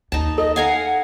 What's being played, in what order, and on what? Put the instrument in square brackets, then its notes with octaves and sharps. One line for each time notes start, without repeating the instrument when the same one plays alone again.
[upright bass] D#2 [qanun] D#4 A5
[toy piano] A4 [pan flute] D#5
[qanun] F5 G#5 A#5 [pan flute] F#5